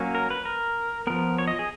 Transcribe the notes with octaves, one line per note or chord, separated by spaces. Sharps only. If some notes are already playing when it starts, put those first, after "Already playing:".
Already playing: F#3 A#3 C#4
A#4
B4
A#4
F3 B3 A#4
C#5
D#5
G#4